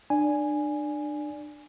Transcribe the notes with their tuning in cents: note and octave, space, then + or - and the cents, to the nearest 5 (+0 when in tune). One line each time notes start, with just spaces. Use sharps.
D4 +30 D5 -10 G#5 +0